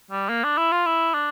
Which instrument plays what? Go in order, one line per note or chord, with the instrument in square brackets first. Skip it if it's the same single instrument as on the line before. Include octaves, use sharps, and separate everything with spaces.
[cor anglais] G3
A#3
D4
E4
F4
E4
D4